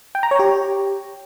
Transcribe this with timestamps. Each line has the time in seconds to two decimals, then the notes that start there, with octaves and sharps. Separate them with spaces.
0.15 G5
0.23 A#5
0.31 C#5
0.39 G4